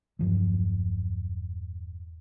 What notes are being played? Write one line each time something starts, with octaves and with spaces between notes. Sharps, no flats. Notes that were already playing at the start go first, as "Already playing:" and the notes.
E1 G2 F3 F#3